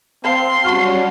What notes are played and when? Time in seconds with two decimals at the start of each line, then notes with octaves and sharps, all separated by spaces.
0.25 C4 C5 F5 A5 C6
0.64 G3 C#4 F#4 A5 C#6 F6